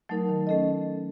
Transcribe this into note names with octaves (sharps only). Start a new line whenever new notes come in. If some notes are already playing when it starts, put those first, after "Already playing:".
F#3 A3 D#4 A#4
D#3
A3 C#4 A4 D#5